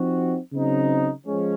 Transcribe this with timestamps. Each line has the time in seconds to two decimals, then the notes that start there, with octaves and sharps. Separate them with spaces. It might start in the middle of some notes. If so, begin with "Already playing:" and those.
Already playing: F3 C4 D#4 F#4
0.52 C#3 F#3 C4 D#4
1.25 F3 G#3 C#4